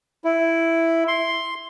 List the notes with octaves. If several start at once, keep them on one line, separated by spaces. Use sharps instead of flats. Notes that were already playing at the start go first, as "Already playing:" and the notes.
E4
C6